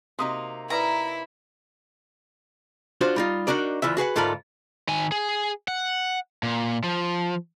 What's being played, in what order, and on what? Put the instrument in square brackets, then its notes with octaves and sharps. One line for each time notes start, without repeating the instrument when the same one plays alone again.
[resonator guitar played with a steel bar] C3 A#3 D#4 [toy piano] F#4 C6 D#6
[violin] E4 [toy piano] A4 B4 D5 [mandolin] A#5
[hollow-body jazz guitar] D4 F4 F#4 C5
G3 D#4 F4
D4 D#4 F#4 A#4 D5
D2 E3 F4 E5
F#4 G#4 B4 F#5
D2 G#2 F4 A4 A#4 B5
[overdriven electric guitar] D#3 G#5
G#4
F#5
A#2
F3